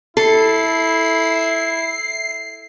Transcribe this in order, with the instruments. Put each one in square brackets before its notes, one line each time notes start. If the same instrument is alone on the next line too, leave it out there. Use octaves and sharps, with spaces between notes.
[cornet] E4 [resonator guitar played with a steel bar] A4 [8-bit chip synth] C7